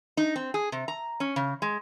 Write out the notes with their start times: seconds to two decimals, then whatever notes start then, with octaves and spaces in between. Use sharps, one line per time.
0.17 D#4
0.36 C4
0.54 G#4
0.72 C3
0.88 A#5
1.20 C#4
1.36 C#3
1.62 G#3